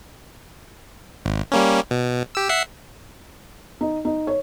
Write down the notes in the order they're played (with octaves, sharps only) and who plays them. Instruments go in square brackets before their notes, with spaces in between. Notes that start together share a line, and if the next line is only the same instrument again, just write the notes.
[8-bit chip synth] G#1
G3 A#3 C#4
B2
G4 E6
E5 F#5 C7
[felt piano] D#4
D#4
C#5